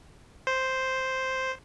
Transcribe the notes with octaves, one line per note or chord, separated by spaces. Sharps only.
C5